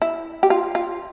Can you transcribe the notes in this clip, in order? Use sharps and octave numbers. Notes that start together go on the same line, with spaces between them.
E4
G4
F4
F4